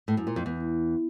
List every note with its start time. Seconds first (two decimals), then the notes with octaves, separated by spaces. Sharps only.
0.08 A2
0.17 F#2
0.27 A#2
0.36 F2
0.46 E2